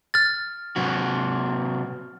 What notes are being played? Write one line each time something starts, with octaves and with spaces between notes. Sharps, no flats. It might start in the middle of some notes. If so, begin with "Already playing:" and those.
F6 A6
C3 F#3 F#4